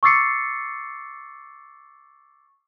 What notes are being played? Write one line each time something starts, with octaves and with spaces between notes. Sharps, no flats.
C#6 D6 E6 A6 C7 C#7